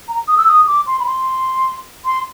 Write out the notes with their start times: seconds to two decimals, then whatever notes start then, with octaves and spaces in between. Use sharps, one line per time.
0.08 A#5
0.28 D#6
0.37 E6
0.48 D#6
0.67 D6
0.87 C6
1.00 B5
1.06 C6
2.05 C6